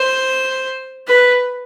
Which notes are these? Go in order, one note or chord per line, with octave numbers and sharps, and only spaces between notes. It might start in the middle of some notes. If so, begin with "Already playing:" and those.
Already playing: C5
B4